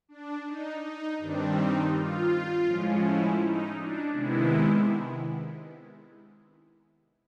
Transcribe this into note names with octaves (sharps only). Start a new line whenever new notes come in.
D4
D#4
D#4
G2 D#3 G3 C4 D4
D#4
F4
A2 F3 G#3 C#4
E4
D#4
D4
C3 D#3 G#3 B3 E4